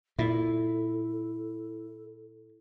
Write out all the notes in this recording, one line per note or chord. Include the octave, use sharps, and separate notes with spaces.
A#2 E4 A4